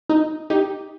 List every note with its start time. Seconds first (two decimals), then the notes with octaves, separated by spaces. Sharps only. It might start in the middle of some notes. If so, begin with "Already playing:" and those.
0.09 D#4
0.50 D#4 G4